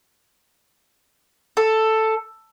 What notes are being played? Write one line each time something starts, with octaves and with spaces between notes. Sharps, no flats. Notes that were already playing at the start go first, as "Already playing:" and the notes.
A4